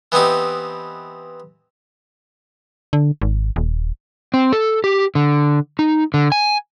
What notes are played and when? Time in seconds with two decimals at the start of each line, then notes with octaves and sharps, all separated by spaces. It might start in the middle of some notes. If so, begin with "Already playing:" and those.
0.12 E3 B3 C4 D#4 G4
2.93 D3
3.22 G#1
3.56 D#1
4.34 C4
4.52 A4
4.84 G4
5.15 D3
5.79 D#4
6.14 D3
6.32 G#5